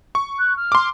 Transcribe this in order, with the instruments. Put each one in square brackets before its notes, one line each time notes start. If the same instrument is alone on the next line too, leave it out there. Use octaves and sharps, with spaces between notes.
[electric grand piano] C#6
[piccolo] F#6
F6
[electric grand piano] C6 D6